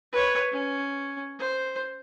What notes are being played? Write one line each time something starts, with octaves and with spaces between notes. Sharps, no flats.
B4 C#5
C#4
C5